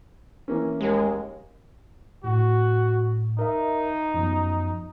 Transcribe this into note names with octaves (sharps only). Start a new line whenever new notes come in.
E3 A#3 C#4
D#2 G#3
A2 F#4
D#4 A#4 E5
F#2 F3 B3